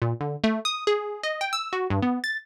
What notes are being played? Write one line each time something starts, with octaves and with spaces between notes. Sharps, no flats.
A#2
D3
A3
D#6
G#4
D#5
G5
E6
F#4
G2
B3
A6